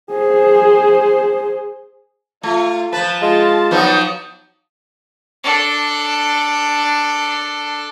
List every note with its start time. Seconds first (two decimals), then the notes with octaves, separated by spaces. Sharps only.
0.11 G#4 C5
2.43 A3 F4
2.93 F3 B4 A5
3.22 G#3 F4 A5
3.71 F3 F#3 B3 D#4
5.44 D4 A4